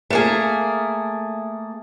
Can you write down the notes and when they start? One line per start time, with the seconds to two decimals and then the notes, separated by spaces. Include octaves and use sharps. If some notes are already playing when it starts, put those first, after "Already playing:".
0.10 A3 A#3 G#4